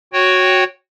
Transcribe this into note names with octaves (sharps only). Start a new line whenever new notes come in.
F#4 C#5 G5